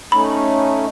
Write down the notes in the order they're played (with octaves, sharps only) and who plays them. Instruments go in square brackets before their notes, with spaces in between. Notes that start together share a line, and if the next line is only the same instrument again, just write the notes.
[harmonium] A3 C#4 D#4 [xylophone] B5